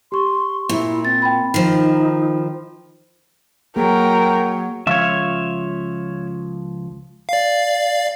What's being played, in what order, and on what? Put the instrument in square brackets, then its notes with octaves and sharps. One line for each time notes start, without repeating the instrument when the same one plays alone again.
[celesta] G4 C#6 [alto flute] C6
[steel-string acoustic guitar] A#2 [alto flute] E4
[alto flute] C4 [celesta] A6
[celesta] G5 B5
[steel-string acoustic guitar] D#3 F3 [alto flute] D#4
[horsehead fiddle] F#3 [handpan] A#3 G#4 [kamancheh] A#4 G5
[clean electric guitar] C#2 F3 F4 [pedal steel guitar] C#5 E5
[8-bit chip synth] D5 F5